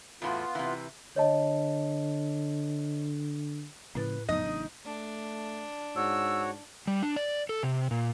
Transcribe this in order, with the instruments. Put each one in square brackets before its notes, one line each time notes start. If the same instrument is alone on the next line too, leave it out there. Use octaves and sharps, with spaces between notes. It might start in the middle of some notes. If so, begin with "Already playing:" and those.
[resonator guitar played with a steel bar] E2 A2 F#4 [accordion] B3 F4
[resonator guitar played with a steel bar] C3 E3
[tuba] D3 [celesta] C#5 D#5 A5
[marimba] A2 E4 A6 [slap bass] C#3 F3 A#3 [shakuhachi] B4
[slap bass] F2 A2 D3 [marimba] F#3 B3 [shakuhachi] D#4 [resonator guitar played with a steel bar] D#5
[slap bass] A1 C#3 D4
[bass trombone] A3 [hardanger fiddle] D4
[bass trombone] G#2 [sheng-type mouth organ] F#4 C#5 [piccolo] E6
[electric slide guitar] G3
D4
D5
A4
C3
A#2